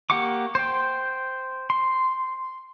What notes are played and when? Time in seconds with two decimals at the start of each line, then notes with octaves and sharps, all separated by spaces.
0.10 A#3 G4 F#5 C#6 D6
0.55 C5 G5
1.70 C6